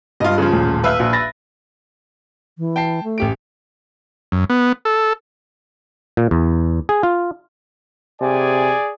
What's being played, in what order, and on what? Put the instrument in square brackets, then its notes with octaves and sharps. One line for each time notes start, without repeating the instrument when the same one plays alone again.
[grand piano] G2 [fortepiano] F4 D#5
[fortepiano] C#3 F3
[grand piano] D#1 A1
[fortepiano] B4 E5 F5
[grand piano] A#1
B5 A6 A#6
[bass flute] E3
[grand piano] G5 A5 C7
[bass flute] A3
[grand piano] A1 G4 D7
[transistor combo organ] F#2
B3
A4
[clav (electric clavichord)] A#2
E2
G#4
F4
[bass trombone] C3 [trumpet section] G#4 D5 G#5